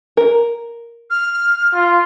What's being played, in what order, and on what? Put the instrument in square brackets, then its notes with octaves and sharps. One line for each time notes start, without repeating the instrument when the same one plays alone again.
[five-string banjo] A#4
[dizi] F6
[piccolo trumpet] F4